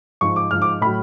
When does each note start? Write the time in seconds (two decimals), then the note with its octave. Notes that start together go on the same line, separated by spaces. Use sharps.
0.21 G#2 F3 C#6
0.36 D6
0.51 G#2 F3 F6
0.62 D6
0.81 A2 F#3 B5